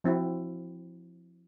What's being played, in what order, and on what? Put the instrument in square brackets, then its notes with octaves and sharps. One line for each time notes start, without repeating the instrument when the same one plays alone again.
[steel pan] F3 C4 E4 F#4